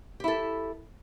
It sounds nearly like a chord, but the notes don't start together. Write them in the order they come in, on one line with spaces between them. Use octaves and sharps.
G4 E4 A4